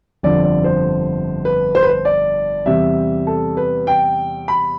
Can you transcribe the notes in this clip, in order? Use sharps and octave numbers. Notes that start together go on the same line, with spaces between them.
G1 F2 D3 F3 D5
D5
C5
B4
C5
B4
C5
D5
E2 C3 G3 E5
A4
B4
G5
B5